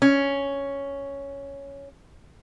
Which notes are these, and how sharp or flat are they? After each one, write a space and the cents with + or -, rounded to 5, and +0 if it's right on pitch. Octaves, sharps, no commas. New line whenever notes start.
C#4 +5